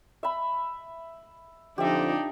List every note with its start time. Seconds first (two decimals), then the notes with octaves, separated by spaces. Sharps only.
0.23 E5 B5
1.78 F2 D3 F3 D4 D#4 G4 E5